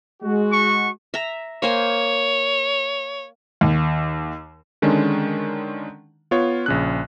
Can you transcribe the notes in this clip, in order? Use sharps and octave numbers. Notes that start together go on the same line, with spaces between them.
G#3 F#4
C#6
E5 A#5
A#3 C5 C#5 G#5
D#2
D3 D#3 G#3 C#4 D4
B3 F4 C#5
A#1 C#3 F#6